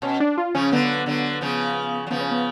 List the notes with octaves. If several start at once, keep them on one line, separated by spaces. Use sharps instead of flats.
B2 C#4
D4
F4
C#3 F3 C#4
D3 F#3 B3
D3 F#3
C#3 F3
F#3
C#3 F3 B3
C#4
B3